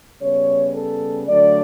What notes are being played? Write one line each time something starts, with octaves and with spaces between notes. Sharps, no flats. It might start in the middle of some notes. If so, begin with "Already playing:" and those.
C#3 G3 B3 C#5
A4
D3 F#3 A3 D5